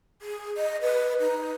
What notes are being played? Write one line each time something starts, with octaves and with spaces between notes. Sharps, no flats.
G#4
D#5
B4
D#4